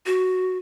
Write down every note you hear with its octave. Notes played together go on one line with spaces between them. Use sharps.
F#4